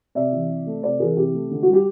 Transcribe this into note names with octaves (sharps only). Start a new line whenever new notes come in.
C3 D5 E5
E3
C3
A3
C3 C5 D5
E3 G#4 A#4
C3 G4
A3
D3
F#4
G3
G4